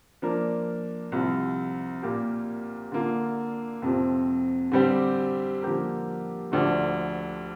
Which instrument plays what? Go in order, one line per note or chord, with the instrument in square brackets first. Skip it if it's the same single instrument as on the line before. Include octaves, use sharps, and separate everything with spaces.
[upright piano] F3 A#3 D4 A#4
C2 C3 F3
A#2 A#3 G4 A#4
D3 A#3 F4
F2 C3 F3
D3 G3 C4 G4
D3 F3 A#3 G4 A#4
D2 D3 F3 D4 G4